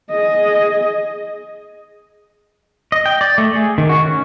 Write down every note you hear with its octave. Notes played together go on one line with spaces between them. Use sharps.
G#4 D#5
D#5
G5
D5
A3
G#4
D#3
F#4
C#4